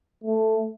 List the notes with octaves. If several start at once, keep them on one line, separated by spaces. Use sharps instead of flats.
A3